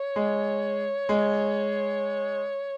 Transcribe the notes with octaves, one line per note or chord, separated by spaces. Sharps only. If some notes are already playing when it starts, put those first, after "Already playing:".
Already playing: C#5
G#3
G#3